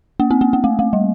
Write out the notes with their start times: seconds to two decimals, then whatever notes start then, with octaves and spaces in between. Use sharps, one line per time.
0.20 A#3
0.31 C4
0.41 A#3
0.53 A#3
0.64 A3
0.79 A3
0.93 G3